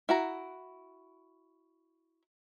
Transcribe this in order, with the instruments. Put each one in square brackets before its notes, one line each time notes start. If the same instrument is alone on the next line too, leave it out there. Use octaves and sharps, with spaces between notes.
[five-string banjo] E4 F#4 A#5